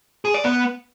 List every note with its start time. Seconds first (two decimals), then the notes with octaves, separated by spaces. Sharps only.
0.25 G#4
0.34 D5
0.44 B3